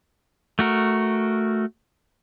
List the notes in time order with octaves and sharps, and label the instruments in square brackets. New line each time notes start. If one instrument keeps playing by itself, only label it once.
[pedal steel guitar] A3 F#4 A#4